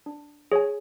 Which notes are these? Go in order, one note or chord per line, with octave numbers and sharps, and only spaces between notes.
D4
G#4 C#5 G#5